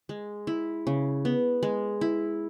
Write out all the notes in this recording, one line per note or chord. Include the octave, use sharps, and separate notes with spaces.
G#3
E4
C#3
B3
G#3
E4